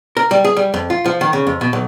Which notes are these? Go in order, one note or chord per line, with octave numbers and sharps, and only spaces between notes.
A#4
G3
G#4
G3
F2
F4
F3
D#3
C#3
F2
B2
B1